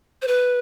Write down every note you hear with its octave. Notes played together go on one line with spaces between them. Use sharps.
C5
B4